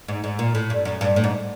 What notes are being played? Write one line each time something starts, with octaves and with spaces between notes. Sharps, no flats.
G#2
G#2
A#2
A2
G2
F#2
G2
A2
G#2